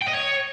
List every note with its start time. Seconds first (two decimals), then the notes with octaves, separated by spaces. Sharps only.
0.02 G5
0.07 D#5
0.13 C#5